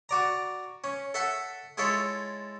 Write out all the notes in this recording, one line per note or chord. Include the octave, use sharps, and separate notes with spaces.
F#4 D5 A#5
C#4
A4 E5 F#5 A5
G#3 E4 F4 A4 C#5